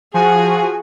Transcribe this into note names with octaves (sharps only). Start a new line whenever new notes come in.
F3 F#4 G#4 G#5